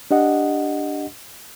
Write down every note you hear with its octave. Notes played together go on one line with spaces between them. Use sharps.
D4 G4 D#5 F#5